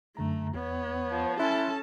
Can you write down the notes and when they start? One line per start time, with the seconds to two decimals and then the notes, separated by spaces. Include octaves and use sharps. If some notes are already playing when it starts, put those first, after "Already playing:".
0.17 F#2 D3 A3 A#5
0.55 E2 B3 C#5
1.10 F3
1.39 C#4 E4 A4 A5 C6 F#6 A6